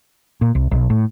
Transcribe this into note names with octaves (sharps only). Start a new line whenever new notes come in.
A#2
C2
B1
A2